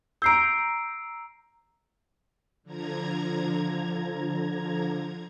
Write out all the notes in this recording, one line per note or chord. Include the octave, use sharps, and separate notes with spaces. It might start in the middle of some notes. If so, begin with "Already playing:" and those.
A#5 E6 G6 C7 D7
D3 F3 A#5 G#6